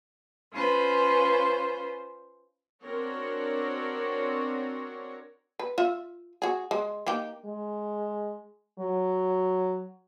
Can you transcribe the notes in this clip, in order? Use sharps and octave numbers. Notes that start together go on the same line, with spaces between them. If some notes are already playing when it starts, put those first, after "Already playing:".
C#4 F4 B4 C5
C4 D4 F#4 A#4 C#5
B4
F4 E5
F#4 G#4
G#3
A#3 D#4 G4
G#3
F#3